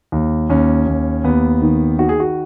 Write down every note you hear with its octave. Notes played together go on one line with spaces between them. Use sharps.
D#2
D#2 C#4
D#2
D#2 B3
D#3
D#3 F#4
G#4
F#4